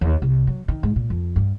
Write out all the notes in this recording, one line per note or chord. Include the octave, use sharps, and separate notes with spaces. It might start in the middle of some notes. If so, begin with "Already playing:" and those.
D#2
C2
F#3
D#3
G#2
A#2
F2
G2